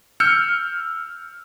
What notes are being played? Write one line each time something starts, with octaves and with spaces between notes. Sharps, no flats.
E6 F6 G6 C#7